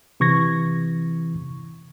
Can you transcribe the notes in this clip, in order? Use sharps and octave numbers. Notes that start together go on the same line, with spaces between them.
C3 E3 C#6 G#6 A#6